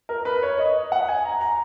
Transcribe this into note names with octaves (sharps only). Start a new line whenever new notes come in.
A#4
B4
C#5
D#5
F#5
G#5
A#5
A#5